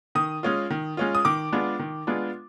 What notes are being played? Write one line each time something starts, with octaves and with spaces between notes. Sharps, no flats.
D#3 D#6
G#3 C#4 F4
D#3
G#3 C#4 F4
D#6
D#3 D6
G#3 B3 D4 F4
D#3
G#3 B3 D4 F4